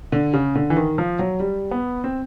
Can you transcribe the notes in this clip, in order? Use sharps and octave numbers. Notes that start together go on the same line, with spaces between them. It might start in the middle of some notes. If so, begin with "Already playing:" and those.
D3
C#3
D3
E3
D#3
F3
F#3
G3
B3
C4